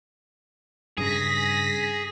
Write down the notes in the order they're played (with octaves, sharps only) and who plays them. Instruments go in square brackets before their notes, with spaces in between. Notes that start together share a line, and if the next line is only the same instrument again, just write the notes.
[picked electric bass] G2 C#3 [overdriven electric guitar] G#4 [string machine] A#6 B6